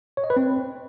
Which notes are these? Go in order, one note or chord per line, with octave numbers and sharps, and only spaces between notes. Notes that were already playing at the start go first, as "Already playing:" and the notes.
C#5
D#5
B4
C4